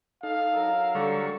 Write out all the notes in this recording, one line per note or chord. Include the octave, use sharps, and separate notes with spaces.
D#4 A4 F5
F#3 A#4 E6
D3 G3 C#6